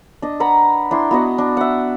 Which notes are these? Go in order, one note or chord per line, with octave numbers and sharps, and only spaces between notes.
D4 D#5
B4 F#5 A#5 B5
D4 E4 C6
B3 F#4 D#5 F#5
D4
E5 F#5